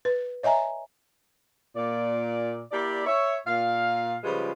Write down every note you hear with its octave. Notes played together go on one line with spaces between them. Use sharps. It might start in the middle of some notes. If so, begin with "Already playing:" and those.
B4
C#5 D#5 E5 G#5 A#5
A#2 D5
A#3 E4 G4 A#4 D5
C#5 E5
A#2 F5
C#3 F3 G3 G#3 F4 B4